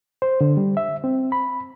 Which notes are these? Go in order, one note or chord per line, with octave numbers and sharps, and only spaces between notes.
C5
D3
G3
E5
C4
B5